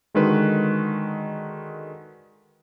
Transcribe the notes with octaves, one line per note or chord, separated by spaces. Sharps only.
D3 D#3 G#3 F#4 B4